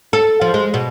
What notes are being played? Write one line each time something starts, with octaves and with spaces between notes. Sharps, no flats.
A4
F3
G#3
B2